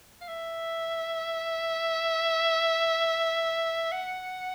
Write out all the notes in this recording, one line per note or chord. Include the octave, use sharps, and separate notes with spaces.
F5
E5
F#5